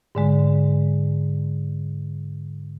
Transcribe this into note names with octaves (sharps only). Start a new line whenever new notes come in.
G#2 D3 G#3